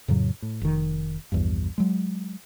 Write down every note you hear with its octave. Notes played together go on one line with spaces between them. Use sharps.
F2 A2 C#3 F#3
A2
F1 D#3
A#1 E2 G2
F#3 G#3